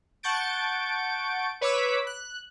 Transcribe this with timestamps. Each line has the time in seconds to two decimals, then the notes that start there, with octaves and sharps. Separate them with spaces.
0.23 F#5 A5 C#6 G6 A6 D7
1.61 B4 C#5 B5 D6 E6 B6
2.07 F#6